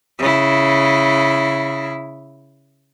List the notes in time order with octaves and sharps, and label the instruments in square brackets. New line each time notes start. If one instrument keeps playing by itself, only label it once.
[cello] C#3 E4